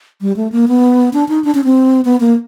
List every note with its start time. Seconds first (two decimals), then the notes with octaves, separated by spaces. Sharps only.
0.21 G3
0.36 A3
0.52 A#3
0.68 B3
1.13 D4
1.29 D#4
1.44 D4
1.55 C#4
1.64 C4
2.05 B3
2.20 A#3